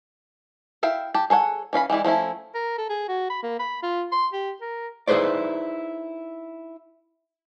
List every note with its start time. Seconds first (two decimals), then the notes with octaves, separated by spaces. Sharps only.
0.83 E4 E5 F5 G5
1.14 G4 A5
1.30 G#4 A4 C#5 F#5
1.73 E3 C#4 F5 B5
1.90 E3 G3 G#3 E4
2.04 F3 A3 C#4 E4
2.55 A#4
2.78 A4
2.90 G#4
3.08 F#4
3.30 B5
3.43 A#3
3.59 B5
3.83 F4
4.12 C6
4.33 G4
4.61 A#4
5.07 D#4 E4 G#4 B4 C5 D5